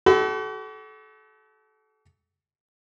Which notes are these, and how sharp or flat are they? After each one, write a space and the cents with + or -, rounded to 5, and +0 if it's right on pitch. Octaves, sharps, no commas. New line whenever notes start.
F#4 +45 A4 -30 B5 +45